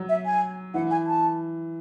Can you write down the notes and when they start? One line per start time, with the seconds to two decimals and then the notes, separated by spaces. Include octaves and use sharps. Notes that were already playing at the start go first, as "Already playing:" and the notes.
Already playing: F#3
0.09 E5
0.26 G#5
0.74 E3 F#5
0.91 G#5
1.07 A5